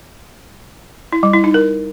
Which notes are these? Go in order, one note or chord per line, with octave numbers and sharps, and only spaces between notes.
E4
G3
E4
D#4
A#4